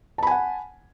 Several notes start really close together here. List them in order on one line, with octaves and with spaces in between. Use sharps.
A5 B5 G#5 F#5